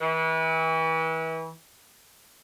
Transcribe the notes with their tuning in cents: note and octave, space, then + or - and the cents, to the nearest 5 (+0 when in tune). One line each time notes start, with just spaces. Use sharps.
E3 -30